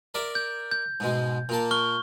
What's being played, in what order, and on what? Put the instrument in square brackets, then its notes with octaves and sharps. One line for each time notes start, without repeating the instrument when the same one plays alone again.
[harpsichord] A#4 D5 E5
[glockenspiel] G6
G6
[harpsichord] G#2 B2 G#3
A#2 A#3 A5
[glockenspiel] C#6 F6 G7